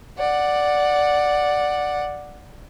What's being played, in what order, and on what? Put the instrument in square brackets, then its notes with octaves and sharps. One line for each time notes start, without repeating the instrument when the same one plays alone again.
[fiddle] D5 F#5